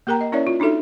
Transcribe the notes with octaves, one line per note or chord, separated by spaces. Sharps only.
A#3 G4 A#4 G5 A#5
D#5
C#4 E4 A#4 C#5 D5 E5
F4
D4 D#4 F#4 A4 E5